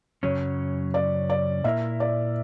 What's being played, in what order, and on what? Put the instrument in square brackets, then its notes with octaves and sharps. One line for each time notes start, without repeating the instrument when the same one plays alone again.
[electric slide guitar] F#2 C#3 F#3 C#4 [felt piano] C#5
[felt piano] D5
D5
[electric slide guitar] A#2 A#3 E4 A#4 [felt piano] E5
[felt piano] D5